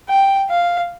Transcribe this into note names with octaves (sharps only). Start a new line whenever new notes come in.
G5
F5